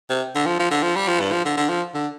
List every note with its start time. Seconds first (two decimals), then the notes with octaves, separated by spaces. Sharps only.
0.10 C3
0.35 D3
0.46 F3
0.59 F3
0.70 D3
0.83 F3
0.96 G3
1.08 F3
1.20 G2
1.32 F3
1.45 D3
1.57 D3
1.69 F3
1.94 D3